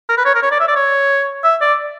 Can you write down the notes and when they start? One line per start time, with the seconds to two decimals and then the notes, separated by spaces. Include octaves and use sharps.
0.09 A#4
0.17 B4
0.25 C#5
0.35 A#4
0.42 C#5
0.51 D5
0.60 E5
0.68 D5
0.76 C#5
1.44 E5
1.61 D5